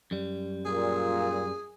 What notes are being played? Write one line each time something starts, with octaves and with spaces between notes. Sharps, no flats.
F#2 G3
A#2 G#4